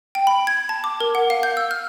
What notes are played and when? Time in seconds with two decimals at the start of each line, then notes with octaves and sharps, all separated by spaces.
0.15 G5
0.27 B5
0.47 G#6
0.69 A5
0.84 D6
1.00 A#4
1.15 F#5
1.30 F5
1.43 G6
1.57 E6
1.71 F6